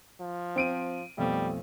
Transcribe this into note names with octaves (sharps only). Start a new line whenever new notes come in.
F3
C4 D7 D#7
B1 F2 G3 A3